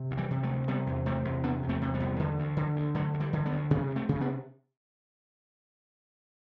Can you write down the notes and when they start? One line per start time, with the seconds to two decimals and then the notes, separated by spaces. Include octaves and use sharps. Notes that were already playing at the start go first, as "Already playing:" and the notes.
Already playing: C3
0.11 D2
0.17 E3 G3
0.31 C3
0.43 F#3 A3
0.49 D2
0.68 C3 G3 B3
0.87 E2
1.06 C3 A3 C4
1.25 E2
1.43 C3 B3 D4
1.63 E2
1.69 A3 C4
1.81 C3
1.94 G3 B3
2.00 E2
2.19 D3
2.39 D2
2.57 D3
2.76 D2
2.95 D3 F#3 A3
3.14 D2
3.20 E3 G3
3.33 D3
3.46 G3 B3
3.52 D2
3.71 C3 G3 B3
3.90 D2
3.96 A3 C4
4.09 C3
4.21 B3 D4